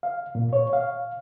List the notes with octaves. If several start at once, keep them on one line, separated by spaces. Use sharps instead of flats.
F5
A#2
C#5
F5